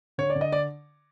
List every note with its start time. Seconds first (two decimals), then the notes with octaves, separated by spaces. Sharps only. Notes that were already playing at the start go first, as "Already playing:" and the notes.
0.18 D3 C#5
0.30 D5
0.35 D3
0.41 D#5
0.52 D5